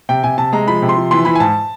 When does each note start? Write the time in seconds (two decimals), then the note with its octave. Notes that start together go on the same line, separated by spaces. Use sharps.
0.09 C3 G5
0.24 C3 G#5
0.38 C3 A5
0.53 G#3 A#5
0.67 F3 B5
0.82 C3
0.89 C6
0.97 F3
1.11 E3 C6
1.25 E3 B5
1.35 G#5
1.40 G#2 A5